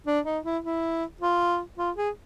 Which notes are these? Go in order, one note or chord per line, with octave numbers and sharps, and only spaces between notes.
D4
D#4
E4
E4
F4
F4
G#4